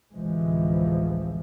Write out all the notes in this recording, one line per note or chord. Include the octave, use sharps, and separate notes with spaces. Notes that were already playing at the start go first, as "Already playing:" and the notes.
A1 D2 C3 E3 F3 G#3